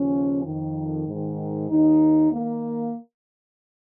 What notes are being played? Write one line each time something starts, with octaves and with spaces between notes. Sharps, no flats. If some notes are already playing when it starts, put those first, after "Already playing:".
Already playing: D#2 C#3 F3 C#4
F2 D#3
G#2 D#3
D#2 D#3 D#4
D#3 A#3